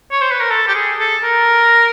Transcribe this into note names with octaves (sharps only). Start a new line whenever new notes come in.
C#5
C5
B4
A#4
A4
G4
G#4
A4
A#4